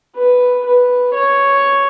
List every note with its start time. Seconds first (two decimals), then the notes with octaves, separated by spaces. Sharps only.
0.16 B4
0.65 B4
1.14 C#5